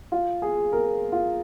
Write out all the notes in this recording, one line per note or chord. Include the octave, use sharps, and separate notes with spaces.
F4
G#4
A#4
F4